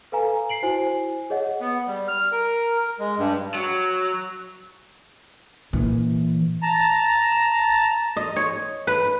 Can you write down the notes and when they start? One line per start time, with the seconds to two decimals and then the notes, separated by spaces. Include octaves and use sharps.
0.12 A4 B4 F5 G#5 A#5
0.49 C7 D7 F#7
0.63 E4 F#4 C5 G#5
1.30 G#4 C#5 D#5 F#5
1.61 B3
1.88 G3
2.08 F6
2.32 A#4
2.99 G#3
3.19 G2
3.55 F#3
5.73 A#2 E3
6.63 A5 A#5
8.17 D#5
8.36 C#5
8.87 B4